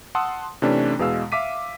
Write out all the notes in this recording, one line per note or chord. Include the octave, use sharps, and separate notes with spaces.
F#5 A5 C6 D#6 E6
C3 E3 A3 C#4 D4
E2 B2 G#3 F5 E6
E5 F5 D6 B6 D#7